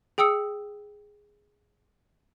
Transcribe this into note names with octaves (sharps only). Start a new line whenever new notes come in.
G#4 G5 D#6 E6 C#7